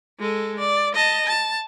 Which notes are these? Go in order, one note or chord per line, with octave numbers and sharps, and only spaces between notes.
G#3 A4
D5
D#5 A5
A5